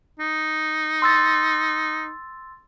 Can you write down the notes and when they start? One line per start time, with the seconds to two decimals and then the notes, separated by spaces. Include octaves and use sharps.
0.20 D#4
1.02 C6 E6 A6